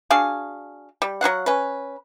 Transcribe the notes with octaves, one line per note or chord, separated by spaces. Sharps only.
D4 F#4 G#4 F5
G3
F#3 F4 F5 F#5
C#4 B4